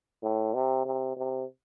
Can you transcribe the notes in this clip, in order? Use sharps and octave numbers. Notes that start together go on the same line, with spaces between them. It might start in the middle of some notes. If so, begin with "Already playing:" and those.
A2
C3
C3
C3